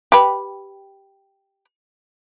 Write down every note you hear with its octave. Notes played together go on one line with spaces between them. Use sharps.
G4 B4